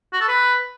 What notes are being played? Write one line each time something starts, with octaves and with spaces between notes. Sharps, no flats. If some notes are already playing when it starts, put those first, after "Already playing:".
F#4
A4
B4